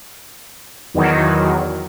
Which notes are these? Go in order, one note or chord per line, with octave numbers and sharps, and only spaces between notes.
E2 D#3 F#3